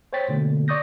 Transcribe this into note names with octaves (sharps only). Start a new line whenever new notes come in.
C5 C#5 G5 A6 B6
B2 D3 A3 A#3
D5 C#6 D#6 G6 A#6